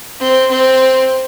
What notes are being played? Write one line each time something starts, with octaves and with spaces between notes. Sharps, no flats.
C4
C4